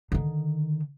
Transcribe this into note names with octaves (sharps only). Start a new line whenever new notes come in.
D3 D#3